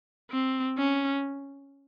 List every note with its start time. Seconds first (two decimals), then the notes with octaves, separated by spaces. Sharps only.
0.31 C4
0.77 C#4